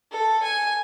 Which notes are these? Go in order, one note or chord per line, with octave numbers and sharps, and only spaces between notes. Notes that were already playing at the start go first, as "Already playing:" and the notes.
A4
G#5